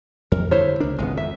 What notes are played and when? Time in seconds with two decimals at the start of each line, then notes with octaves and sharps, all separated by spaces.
0.32 F2 A#4
0.51 G2 D3 E4 C5 C#5
0.80 C#2 D4 A#4
0.99 G#1 C#2 G#3 B3
1.17 F2 E5